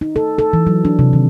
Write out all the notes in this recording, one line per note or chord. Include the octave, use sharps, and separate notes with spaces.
D#4
A4
A4
E3
F#3
D4
C3
D#3